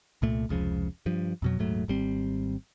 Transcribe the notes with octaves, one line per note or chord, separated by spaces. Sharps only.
C2 A#2 A3
F1 C#2 C#3 F3
G2 F3
F2 B2 F#3
D#1 G#2 F#3 A3
G#1 G3 C4